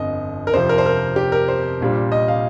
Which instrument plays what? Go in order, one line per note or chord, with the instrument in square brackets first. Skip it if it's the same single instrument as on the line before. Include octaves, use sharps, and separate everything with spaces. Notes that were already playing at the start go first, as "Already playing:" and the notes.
Already playing: [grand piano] G1 F2 D#5
A#4
F2 C3 F3 C5
A#4
C5
A#4
G4
A#4
C5
A#1 A#2 G3
D#5
F5